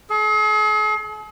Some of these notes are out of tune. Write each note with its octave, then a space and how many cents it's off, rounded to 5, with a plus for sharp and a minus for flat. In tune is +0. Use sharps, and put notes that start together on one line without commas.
G#4 +45